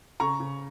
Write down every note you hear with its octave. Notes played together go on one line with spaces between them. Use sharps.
C#3 A#5 C#6
C#3